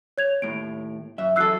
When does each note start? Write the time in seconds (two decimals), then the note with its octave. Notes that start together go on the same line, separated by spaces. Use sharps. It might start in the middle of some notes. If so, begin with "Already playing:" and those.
0.18 C#5 G#6 F7
0.42 D#2 A2 D7
1.18 F#2 E5
1.36 E3 F#3 A4 E6 F#6 C7